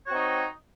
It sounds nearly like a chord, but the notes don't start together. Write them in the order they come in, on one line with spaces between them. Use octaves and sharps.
C#5 F#4 C4 D#4